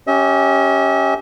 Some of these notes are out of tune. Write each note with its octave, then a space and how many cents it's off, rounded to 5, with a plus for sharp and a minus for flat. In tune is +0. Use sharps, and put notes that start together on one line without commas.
C#4 +0 G4 -5 E5 -45